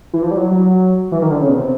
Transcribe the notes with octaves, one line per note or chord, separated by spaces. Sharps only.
E3
F3
G3
F#3
F#3
E3
D#3
D3
C#3
B2
C3